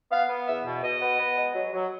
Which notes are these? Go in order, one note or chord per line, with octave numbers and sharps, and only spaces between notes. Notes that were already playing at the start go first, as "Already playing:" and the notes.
B3 F5
B3
E2 E5
B2
B2 D#5
B3
B3
G#3
F#3
F#3